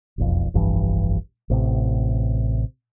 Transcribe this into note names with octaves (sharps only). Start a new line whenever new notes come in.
E1 B1 F2
F1 A#1 G2 E3
A1 A2 C3